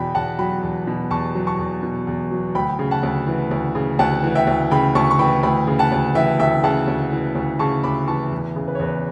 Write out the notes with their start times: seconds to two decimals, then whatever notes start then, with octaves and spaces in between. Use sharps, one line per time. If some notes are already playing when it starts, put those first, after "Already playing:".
Already playing: E2 B2 G5 B5
0.15 E2 F#5 A5
0.38 F#3 G5 B5
0.63 E2
0.87 B2
1.11 E2 A5 C#6
1.35 F#3
1.47 A5 C#6
1.59 E2
1.83 B2
2.07 E2
2.31 F#3
2.55 D2 G5 B5
2.79 C#3
2.91 F#5 A5
3.03 D2
3.27 E3
3.51 D2
3.75 C#3
3.99 D2 F#5 A5
4.23 E3
4.35 E5 G5
4.47 D2
4.71 C#3 G5 B5
4.95 D2 A5 C#6
5.11 C#6
5.19 E3 G5 B5
5.43 D2 G5 B5
5.67 C#3
5.79 F#5 A5
5.92 D2
6.15 E3 E5 G5
6.39 D2 E5 G5
6.63 C#3 F#5 A5
6.88 D2
7.12 E3
7.35 D2
7.59 C#3 A5 C#6
7.84 D2 B5 D6
8.08 E3 A5 C#6
8.31 E2
8.56 C#3
8.68 B4
8.75 C#5
8.79 E2 B4